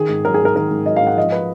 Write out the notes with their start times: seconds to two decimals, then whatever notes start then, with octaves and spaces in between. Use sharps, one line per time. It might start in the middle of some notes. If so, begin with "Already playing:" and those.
Already playing: D#3 G#4
0.09 G#2
0.25 F#3 A#4
0.34 G#4
0.40 G#2 A#4
0.55 D#3 A#4
0.71 G#2
0.86 F#3 D#5
0.96 F5
1.01 G#2
1.07 F#5
1.17 F3 D#5
1.32 B4